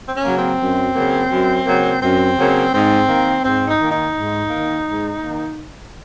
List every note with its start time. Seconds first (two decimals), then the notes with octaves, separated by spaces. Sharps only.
0.08 C4
0.13 C#4
0.25 C#3 F#3 A#3
0.36 C4
0.60 F#2
0.95 C#3 F#3 A#3
1.30 F#2
1.66 C#3 F#3 A#3
2.01 F#2 C4
2.38 C#3 F#3 A#3
2.73 G#2 C4
3.08 D#3 A#3
3.44 G#2 C4
3.67 D#4
3.80 D#3 A#3
3.91 D#4
4.15 G#2
4.50 D#3 A#3
4.86 G#2
5.21 D#3 A#3